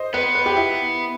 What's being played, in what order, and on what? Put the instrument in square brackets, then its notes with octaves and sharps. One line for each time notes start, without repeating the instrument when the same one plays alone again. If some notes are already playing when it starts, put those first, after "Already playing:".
Already playing: [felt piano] C5 D#5
[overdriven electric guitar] B3 [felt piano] B4
[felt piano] B4
G4
E4